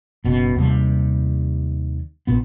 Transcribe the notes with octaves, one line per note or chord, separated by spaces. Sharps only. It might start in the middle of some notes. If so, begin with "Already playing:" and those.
F#1 B2
D#2 C3 G3
A#1 A#2 B3